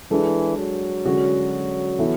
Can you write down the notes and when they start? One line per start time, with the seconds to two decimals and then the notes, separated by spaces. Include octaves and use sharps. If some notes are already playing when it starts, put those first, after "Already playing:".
0.11 E3 G#3 D4 A4
0.58 F#3
1.05 D3 G#3 C#4 F#4 C#5
1.99 E3 B3 E4 A4